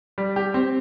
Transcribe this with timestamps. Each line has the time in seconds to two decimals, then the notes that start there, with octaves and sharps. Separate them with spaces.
0.18 G3
0.36 G4
0.54 C4